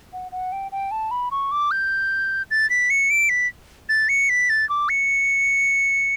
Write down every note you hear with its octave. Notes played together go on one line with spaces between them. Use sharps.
F#5
F#5
G5
G5
A5
B5
C#6
D6
G6
A6
B6
C#7
D7
B6
A6
C#7
B6
A6
D6
C#7